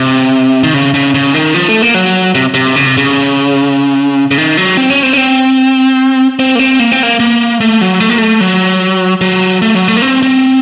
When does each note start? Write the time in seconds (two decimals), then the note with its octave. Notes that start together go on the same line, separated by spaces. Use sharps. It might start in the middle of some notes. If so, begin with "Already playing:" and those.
Already playing: C3
0.63 D#3
0.74 C#3
0.94 C#3
1.14 C#3
1.34 D#3
1.54 F3
1.69 A3
1.82 A#3
1.94 F#3
2.35 C3
2.54 C3
2.76 C#3
2.86 C3
2.97 C#3
4.31 C#3
4.38 D#3
4.57 F#3
4.77 C4
4.90 C#4
5.03 C4
5.13 C#4
5.18 C4
6.39 C4
6.55 A#3
6.59 C4
6.79 A#3
6.92 C4
7.03 A#3
7.20 A#3
7.61 A3
7.81 F#3
8.00 A3
8.10 A#3
8.18 A3
8.41 F#3
9.21 F#3
9.62 A3
9.75 F#3
9.88 A3
9.97 A#3
10.02 C4
10.23 C4